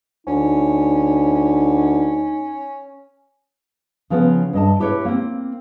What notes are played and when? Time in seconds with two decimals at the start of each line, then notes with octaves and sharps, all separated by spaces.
0.27 D2 C#4 D#4
4.10 C#3 F3 B3 C#4
4.53 G2 D#5 A5
4.80 E4 G4 B4 C#5
5.05 A#3 C4